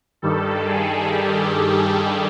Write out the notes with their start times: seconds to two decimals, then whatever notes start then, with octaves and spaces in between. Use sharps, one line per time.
0.22 G2 D#3 G3 A4
0.67 G#4
1.12 G4